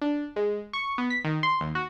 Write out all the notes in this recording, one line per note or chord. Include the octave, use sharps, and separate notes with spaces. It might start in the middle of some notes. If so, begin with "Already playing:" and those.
D4
G#3
C#6
B3
B6
D#3
C6
D#2
F#4